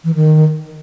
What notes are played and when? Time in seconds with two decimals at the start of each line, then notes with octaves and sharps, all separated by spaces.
0.04 E3
0.15 D#3